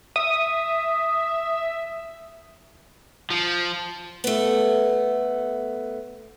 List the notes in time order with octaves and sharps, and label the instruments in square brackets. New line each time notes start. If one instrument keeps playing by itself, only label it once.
[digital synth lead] E5 [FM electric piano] D#6
[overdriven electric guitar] F3
[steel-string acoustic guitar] A3 B3